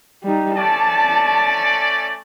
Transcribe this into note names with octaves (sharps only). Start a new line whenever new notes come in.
G3 D#4
A3 C#4 D5 A5